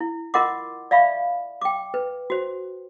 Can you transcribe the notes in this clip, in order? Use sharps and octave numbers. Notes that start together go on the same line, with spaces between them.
E4
F4 A#4 D#5 F#5 C6 D6
D5 E5 F5 B5 C#6
G5 D6
B4
F#4 C5